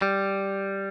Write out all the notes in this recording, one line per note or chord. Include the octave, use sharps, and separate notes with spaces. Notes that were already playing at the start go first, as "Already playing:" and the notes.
G3